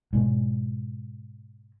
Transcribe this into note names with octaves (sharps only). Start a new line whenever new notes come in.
G#2 B2